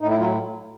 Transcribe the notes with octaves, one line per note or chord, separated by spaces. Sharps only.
A2 D#4
E4
F#3 F4